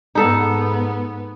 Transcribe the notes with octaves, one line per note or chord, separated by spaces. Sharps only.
G#2 B3 D#4 A4